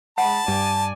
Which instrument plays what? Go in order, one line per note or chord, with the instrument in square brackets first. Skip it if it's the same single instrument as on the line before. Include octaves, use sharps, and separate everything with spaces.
[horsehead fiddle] G#3 B5 [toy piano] F#5 [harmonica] A5
[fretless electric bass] G2 [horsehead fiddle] D5 G#5